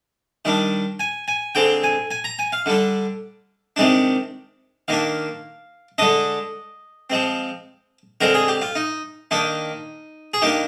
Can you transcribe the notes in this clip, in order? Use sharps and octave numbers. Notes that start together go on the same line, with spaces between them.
D#3 G3 D4
G#5
G#5
D3 G#3 C4 G5
G#5
G#5
A#5
G#5
F5
D3 G3 D4
C3 D#3 G#3 D4
D#3 A#3 D4 F5
D3 G#3 D4 D#5
F3 G#3 C4
D3 G#3 C4 A#4
G#4
G4
F4
D#4
D#3 A#3 D4 D#4
G#4
D#3 A#3 D4 G4